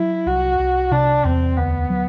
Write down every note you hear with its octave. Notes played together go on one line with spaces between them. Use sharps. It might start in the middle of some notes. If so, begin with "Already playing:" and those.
Already playing: F#3 E4
C2 F#4
C2
C3 D4
E2 C4
D2 B3
F#3